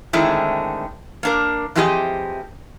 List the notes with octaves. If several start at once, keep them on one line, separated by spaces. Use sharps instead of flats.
D3 D#3 G#3 A3 C4 E4
A#3 D4 A#4
E3 F3 C4 G4 G#4 D#5